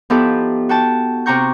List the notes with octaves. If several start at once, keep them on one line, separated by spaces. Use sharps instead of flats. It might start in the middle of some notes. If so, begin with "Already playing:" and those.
F3 B3 D#4 E4 G4 A4
F#4 G5 A5
C3 F#4 G5 A#5 C#6 G6